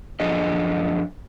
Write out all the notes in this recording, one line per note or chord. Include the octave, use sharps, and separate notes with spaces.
F#2 F3 D4 G#4 A4 D#5